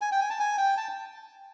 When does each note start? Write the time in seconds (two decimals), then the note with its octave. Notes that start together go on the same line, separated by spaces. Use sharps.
0.01 G#5
0.12 G5
0.21 G#5
0.30 A5
0.40 G#5
0.58 G5
0.77 A5